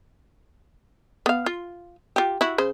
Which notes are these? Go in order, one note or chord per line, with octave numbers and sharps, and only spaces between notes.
B3 F5
F4
F4 G4
E4 F#4
C#3 C5